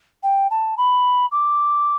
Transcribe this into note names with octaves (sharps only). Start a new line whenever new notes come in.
G5
A5
B5
D6